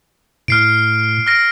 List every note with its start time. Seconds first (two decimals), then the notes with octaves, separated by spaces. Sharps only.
0.48 A2 F6 C7 D7
1.27 F6 A#6 D7